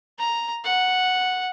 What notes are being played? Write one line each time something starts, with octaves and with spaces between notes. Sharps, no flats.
A#5
F#5